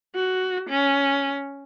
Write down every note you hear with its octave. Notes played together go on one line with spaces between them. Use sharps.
F#4
C#4